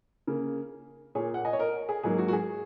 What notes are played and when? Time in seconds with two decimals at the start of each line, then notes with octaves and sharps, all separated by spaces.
0.27 C#3 A#3
1.15 A#2 A#3 G#4 C#5
1.34 F#5
1.45 D#5 G#5
1.53 C#5
1.59 A#4 D#5
1.89 G#4
2.03 G#2 F#3 A#3 G#4
2.18 F#4
2.28 F#4
2.33 G#4